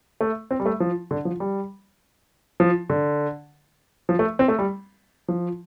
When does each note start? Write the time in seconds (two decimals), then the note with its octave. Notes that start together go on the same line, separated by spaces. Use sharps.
0.21 A3
0.51 C4
0.60 G3
0.66 A3
0.80 F3
1.11 D3
1.25 F3
1.40 G3
2.60 F3
2.90 D3
4.09 F3
4.19 A3
4.39 C4
4.48 A3
4.59 G3
5.28 F3